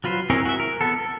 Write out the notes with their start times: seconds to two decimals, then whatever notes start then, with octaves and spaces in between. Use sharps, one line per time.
0.04 F#3 F4 B4 C5
0.30 C4 E4 G#4 A#4 C#5
0.45 F#4 E5
0.60 A#4
0.81 B3 A4
0.98 A4